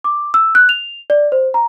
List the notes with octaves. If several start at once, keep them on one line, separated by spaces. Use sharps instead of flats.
D6
E6
F#6
F7
D5
C5
A#5